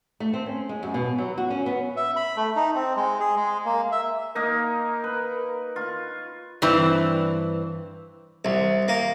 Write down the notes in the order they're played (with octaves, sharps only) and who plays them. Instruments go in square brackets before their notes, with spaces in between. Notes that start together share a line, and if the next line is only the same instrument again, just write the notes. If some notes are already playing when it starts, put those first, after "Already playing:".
[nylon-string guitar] A3
C4
C#4
G#3
F#2
B2
F#3
F#4
C#4
B3
[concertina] E5
B5
A3
D#4
C4
G#3
G#4
G#3
A#3
E5
[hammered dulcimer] A#3 D#4 [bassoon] A#4
[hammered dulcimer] B4
F4 C#6
[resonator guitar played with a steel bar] G2 E3 C4
[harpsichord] C2
A#3